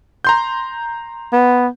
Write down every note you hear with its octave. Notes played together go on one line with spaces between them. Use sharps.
A#5 C6 G6
B3